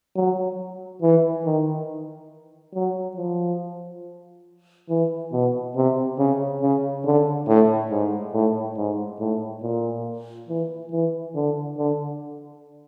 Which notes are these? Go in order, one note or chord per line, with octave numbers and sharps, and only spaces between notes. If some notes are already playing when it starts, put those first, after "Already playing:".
F#3
E3
D#3
F#3
F3
E3
B2
C3
C#3
C#3
D3
A2
G#2
A2
G#2
A2
A#2
E3
E3
D3
D3